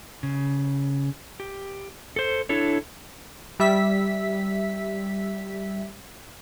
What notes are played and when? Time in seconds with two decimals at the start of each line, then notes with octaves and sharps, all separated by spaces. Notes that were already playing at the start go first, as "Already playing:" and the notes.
0.23 C#3
1.40 G4
2.16 A4 C5
2.49 D4 E4 A4 C#5
3.60 G3 E5 B6